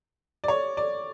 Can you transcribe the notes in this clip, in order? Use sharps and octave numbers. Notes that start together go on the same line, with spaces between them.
D5
C#5
D5